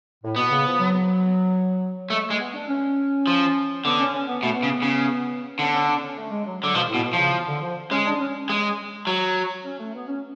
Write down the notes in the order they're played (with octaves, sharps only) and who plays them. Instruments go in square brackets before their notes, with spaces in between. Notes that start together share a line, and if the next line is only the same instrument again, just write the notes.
[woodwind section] A2
[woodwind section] B2 [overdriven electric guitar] B3
[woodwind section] C#3
F3
F#3
[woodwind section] G#3 [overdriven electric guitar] A3
[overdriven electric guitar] G#3 [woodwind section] A3
[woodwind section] B3
D4
C#4
[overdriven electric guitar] F3
[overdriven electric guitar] D3 [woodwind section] B3
[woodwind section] C#4
C#4
B3
[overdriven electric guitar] B2 [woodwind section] A3
[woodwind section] B3
[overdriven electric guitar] C#3
C#3
[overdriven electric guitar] D3 [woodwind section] C#4
[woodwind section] C#4
D4
C#4
A3
G#3
F#3
[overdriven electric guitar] D3 [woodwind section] F#3
[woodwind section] B2 [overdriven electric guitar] F3
[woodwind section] A2
[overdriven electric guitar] B2
[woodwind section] B2
[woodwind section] C#3 [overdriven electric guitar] F3
[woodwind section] D3
F3
[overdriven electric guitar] G#3 [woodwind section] C#4
[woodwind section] D4
C#4
[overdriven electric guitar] G#3
F#3
[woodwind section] C#4
A3
B3
C#4